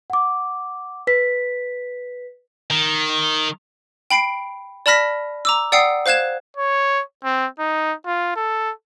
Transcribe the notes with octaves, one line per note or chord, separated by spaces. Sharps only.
F#5 D6
B4 B6
D#3
G5 B5 C7 D7
D5 A5 B5 F6 A#6 B6
A#5 D6 E6
D5 F#5 G5 D#6 E6 C7
C5 F5 F#6 G#6 E7
C#5
C4
D#4
F4
A4